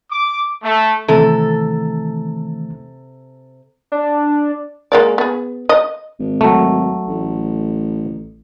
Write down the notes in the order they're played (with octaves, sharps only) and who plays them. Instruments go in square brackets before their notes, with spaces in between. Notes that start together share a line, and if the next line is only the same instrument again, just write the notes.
[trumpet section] D6
A3
[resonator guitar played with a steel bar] C3 A4 [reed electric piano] D#3 E3 A3
[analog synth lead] D4
[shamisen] G#3 A#3 D5
B3 G#4
D#5
[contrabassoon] G#1
[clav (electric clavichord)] F#3 A3
[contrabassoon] A1